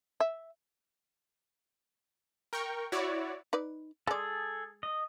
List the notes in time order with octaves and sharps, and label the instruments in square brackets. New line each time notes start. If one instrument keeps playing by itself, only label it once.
[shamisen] E5
[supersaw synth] A#4 G5 C#6
E4 F#4 C#5 D5
[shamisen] D#4 B4 D5
[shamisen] G#3 D5 [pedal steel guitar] G#4 A4
[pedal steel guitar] D#5